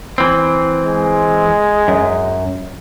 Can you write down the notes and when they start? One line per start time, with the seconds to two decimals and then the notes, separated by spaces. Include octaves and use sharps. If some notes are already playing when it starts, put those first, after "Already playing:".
0.18 E3 C4
0.83 G#3
1.88 F#2